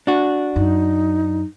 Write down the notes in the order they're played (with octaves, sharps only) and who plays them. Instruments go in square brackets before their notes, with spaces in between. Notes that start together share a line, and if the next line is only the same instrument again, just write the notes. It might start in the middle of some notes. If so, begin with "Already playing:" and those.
[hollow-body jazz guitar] D4 F#4
[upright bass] F#2 [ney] D#4